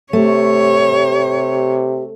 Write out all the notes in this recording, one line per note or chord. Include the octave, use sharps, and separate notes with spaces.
C3 A3 G4 C#5